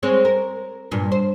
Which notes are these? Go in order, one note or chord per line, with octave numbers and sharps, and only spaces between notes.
G#3 C4 C#5
A#4
G2 A#2
C5